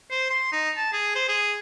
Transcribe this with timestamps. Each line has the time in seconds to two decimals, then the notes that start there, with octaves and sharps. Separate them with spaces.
0.10 C5
0.30 C6
0.52 D#4
0.77 A5
0.92 G#4
1.15 C5
1.29 G#4